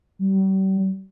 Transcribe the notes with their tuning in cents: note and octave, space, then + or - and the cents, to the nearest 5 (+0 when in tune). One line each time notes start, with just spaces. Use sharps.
G3 -40